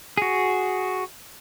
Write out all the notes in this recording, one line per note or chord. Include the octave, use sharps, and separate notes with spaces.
F#4 G#4